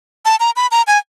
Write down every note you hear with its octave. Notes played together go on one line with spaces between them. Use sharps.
A5
A#5
B5
A#5
G#5